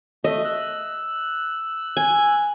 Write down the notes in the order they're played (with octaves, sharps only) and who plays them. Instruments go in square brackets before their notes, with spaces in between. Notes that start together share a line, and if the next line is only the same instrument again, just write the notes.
[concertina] A3 E5 [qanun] D#5
[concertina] E6 F#6
[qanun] G#5